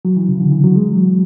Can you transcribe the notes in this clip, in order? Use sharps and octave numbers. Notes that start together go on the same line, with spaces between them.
F#3
E3
C#3
D3
E3
F#3
G#3
F#3